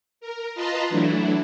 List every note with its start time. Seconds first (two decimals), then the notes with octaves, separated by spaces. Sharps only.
0.21 A#4
0.55 F4 B4 D#5 A5 A#5 C6
0.90 E3 F#3 A3 D4 E4